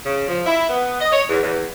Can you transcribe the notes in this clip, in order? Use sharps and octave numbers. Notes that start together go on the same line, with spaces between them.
C#3
F3
E4
B3
D#5
C#5
E2
E2